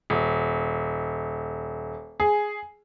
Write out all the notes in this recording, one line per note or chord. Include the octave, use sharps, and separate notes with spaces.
D#1
G#4